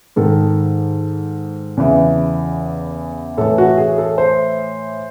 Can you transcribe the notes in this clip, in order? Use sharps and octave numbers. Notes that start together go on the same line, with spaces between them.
G#2 D#3 A4
E2 C#3 E3
A2 E3 A4
F#4
G#4
A4
C5